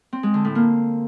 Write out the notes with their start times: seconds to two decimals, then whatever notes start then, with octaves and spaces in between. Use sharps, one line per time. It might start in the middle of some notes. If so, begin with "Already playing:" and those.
0.13 C4
0.23 G#3
0.34 D3
0.45 A2
0.55 A#3